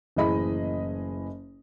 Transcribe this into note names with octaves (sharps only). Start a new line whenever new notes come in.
F#1 A2 E3 G#4 D#5 B5